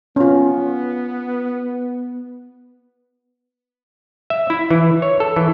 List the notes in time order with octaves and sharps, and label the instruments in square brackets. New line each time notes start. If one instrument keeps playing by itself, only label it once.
[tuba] B3 [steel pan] C#4 F4
[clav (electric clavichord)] E5
E4
E3
C#5
A4
E3